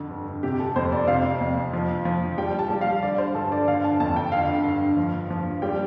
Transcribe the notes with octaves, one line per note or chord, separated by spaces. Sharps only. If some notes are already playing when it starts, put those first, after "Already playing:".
Already playing: F2 D3
G2
C3 G4
A4
F2 C5
D5
C3 F5
F2
F3
F3
G3 G5
A5
G3
F5
D3 D5
C5
G2 A4
D5
D3 F5
A5
F2 A5
G5
D3 F5
G2
F3
F3
G3 G5